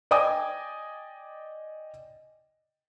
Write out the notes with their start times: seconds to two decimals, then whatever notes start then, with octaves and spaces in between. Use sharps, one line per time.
0.11 D5 D#5 G5 G#5 D6 D#6